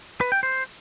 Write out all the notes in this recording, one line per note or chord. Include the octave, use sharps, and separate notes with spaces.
B4
G5
C5